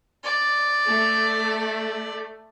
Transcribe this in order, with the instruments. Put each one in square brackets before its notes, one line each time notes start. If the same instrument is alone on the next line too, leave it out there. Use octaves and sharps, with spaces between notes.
[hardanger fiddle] D5
[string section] A3